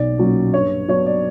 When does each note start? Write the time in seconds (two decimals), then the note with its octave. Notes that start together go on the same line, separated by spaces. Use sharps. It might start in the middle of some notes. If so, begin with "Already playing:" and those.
Already playing: B1 D5
0.17 A#2 F#3 C#4
0.53 G2 C#5
0.88 F#3 B3 D4 C#5
1.06 D5